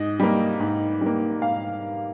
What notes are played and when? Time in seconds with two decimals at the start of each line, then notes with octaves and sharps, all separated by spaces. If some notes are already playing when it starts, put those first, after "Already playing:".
Already playing: G#2 D#5
0.20 G3 A#3
0.60 G#2
1.01 G3 A#3
1.42 G#2 F5